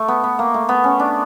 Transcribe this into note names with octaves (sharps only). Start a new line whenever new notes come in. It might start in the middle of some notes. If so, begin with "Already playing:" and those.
Already playing: A3
B3
B3
A#3
A3
B3
C#4
D4